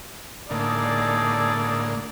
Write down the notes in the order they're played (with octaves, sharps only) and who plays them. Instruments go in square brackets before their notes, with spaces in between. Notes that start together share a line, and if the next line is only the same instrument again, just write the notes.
[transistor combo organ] A2 D3 A#3 [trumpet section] D#4 G#4 A4 [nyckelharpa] D5